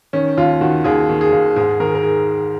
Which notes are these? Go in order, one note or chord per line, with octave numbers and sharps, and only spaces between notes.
D#3 C#4
D#2 F4
D#3 F#4
D#2 G#4
D#3
G#4
D#2
G#2 G#4
D#3 A#4
G#4
A#4
G#4